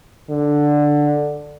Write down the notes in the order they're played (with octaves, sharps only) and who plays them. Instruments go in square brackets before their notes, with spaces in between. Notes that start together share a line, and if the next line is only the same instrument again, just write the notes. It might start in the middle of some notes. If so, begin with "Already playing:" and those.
[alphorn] D3